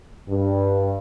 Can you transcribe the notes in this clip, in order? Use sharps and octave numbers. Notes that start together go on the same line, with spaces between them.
G2